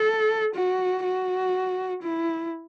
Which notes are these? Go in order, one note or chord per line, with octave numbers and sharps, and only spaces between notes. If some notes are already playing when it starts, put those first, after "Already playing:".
Already playing: A4
F#4
F#4
E4